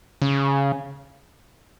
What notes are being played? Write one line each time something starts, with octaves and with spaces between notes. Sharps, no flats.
C#3